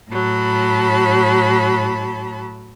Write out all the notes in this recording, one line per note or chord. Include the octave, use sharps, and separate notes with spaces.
A2 F#3 A5 B5